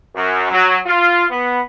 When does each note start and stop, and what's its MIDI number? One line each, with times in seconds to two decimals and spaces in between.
0.16 0.48 42
0.51 0.78 54
0.86 1.25 65
1.31 1.61 59